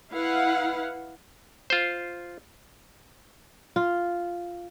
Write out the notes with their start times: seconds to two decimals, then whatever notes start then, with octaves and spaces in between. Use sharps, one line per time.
0.12 E4 B4 F5 F#5
1.70 F4 C5
3.76 F4